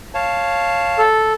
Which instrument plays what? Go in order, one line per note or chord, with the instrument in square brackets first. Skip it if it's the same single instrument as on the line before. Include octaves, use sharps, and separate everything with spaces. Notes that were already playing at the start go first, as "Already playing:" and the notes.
[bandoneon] C#5 F5 A5
[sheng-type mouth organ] A4